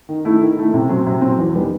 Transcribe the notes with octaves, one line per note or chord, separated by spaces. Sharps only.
D#3
A3 E4
D#3
A3 E4
C3
F#3 C4
C3
F#3 C4
E2
D#3 G3 B3